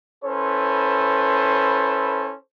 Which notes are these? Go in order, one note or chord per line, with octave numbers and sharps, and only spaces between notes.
C#4 E4 A4 B4 C5